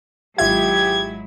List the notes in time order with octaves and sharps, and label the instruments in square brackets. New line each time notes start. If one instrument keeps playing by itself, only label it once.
[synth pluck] G#1 F4 E5 [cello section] F#3 G#3 E4 [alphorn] G4 [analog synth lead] G#6